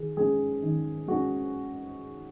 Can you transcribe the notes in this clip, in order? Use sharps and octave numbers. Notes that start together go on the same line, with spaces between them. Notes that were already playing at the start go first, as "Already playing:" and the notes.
Already playing: D#3 G#4
G#3 C#4 G#4
D#3
G#3 C#4 F#4